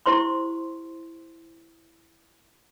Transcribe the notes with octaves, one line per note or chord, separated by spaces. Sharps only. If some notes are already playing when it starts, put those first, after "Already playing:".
E4 G4 C5 C6 C#6